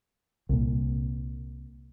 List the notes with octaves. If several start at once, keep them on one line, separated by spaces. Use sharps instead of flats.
C2 A#2